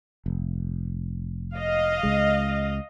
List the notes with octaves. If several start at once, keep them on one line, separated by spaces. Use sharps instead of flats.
F1
D#5 F5
C#2 G#3